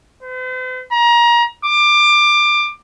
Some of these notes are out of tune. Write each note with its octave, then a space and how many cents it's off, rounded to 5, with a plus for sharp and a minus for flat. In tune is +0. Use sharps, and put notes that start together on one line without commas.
C5 -45
A#5 +30
D6 +20